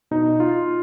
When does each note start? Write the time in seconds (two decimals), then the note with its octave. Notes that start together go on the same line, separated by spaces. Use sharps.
0.11 B2 D#4
0.40 F4